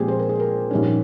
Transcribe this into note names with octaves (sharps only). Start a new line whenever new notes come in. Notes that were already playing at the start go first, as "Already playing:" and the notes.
Already playing: A#1 A#2 G#3 C4 G4 G#4
C5
A#4
G#4
A#4
A#1 G#2 G3 C#4